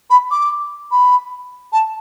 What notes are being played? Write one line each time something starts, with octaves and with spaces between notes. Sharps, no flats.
B5
D6
B5
A5